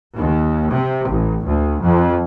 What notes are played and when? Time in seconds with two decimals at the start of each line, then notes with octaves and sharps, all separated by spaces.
0.16 D#2
0.72 C3
1.09 A1
1.46 D2
1.81 F2